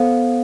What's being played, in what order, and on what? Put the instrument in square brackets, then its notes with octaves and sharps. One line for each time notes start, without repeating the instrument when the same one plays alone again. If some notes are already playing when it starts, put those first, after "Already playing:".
Already playing: [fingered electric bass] B3 [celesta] A4 C5 F5